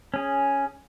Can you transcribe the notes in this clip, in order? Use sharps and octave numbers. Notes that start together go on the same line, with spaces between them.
C#4 G#4